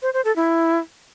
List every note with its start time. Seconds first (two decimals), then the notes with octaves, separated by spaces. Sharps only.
0.02 C5
0.14 C5
0.25 A4
0.36 E4